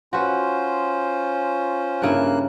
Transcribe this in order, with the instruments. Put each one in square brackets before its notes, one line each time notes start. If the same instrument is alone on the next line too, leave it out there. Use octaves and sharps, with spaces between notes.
[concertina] C#4 F4 C5 [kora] F#4 B4
[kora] G2 C#3 E4 [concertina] A#3 F#6